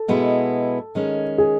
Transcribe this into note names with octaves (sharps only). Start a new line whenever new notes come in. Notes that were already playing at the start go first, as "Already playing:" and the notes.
Already playing: A4
B2 G#3 B3 E4
D#3 G#3 C#4
G#4